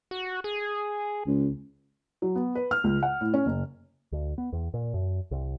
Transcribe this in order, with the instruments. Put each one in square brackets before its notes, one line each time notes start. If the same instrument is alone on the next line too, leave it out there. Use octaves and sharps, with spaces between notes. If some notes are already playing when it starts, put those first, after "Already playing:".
[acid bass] F#4
G#4
[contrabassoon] C#2
[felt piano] F#3
B3
B4
F6
C#2
F#5
A2
C#4
F#1
[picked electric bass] D2
B3
E2
A#2
F#2
C2